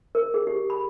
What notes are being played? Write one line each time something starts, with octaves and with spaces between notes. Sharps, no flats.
A#4
G#4
G4
B5